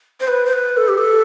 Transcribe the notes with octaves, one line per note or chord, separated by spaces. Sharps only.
C5
B4
C5
B4
A4
G4
A4